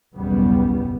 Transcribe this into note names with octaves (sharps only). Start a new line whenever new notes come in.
F#1 B1 E2 C#3 G3 B3